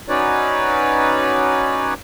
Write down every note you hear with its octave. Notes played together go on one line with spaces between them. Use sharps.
C#4 D#4 F#4 B4 C#5 D5